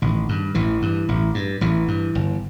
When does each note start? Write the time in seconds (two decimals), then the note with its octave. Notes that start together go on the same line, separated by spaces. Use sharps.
0.02 A1 D#3
0.29 G2
0.55 A1 E3
0.82 G2
1.09 A1
1.34 G2
1.61 A1 E3
1.88 G2
2.15 G1